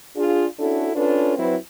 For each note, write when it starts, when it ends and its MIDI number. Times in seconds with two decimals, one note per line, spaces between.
0.16 0.45 62
0.16 0.45 65
0.16 0.45 68
0.59 0.90 61
0.59 0.90 62
0.59 0.90 64
0.59 0.90 66
0.59 0.90 69
0.95 1.34 61
0.95 1.34 62
0.95 1.34 65
0.95 1.34 69
0.95 1.34 71
1.37 1.56 54
1.37 1.56 60
1.37 1.56 64
1.37 1.56 71